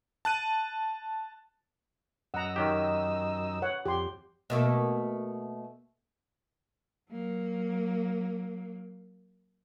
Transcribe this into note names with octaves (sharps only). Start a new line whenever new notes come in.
A5 F#6 D#7
F#2 D#5 F#5 A#5 E6
D#3 F#3 D#4 G4
C#5 F#5
F2 G4 C6
B2 A3 A#3
F#3 A#3